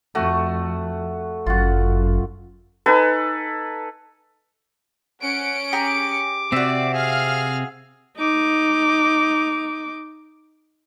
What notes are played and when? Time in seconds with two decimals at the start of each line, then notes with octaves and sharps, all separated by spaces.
0.15 F2 A3 F#4
1.46 G1 F#2 F4 F#4
2.86 D#4 A4 B4 G#5
5.22 C#4 F#5 C#7 D7
5.73 G4 G#4 A#5 D6
6.52 C3 C4 F#4 D5 E5
6.94 G#4 F5 F6
8.17 D#4 D6